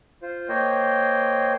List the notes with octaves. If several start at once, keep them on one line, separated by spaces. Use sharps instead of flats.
F4 C5
A#3 C5 C#5 D#5 G5